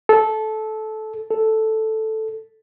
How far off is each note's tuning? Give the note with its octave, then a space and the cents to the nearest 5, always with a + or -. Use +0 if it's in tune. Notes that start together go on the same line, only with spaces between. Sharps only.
A4 -15
A4 +0